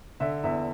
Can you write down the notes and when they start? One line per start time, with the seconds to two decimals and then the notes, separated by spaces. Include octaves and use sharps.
0.20 D3 E5
0.44 E2 E5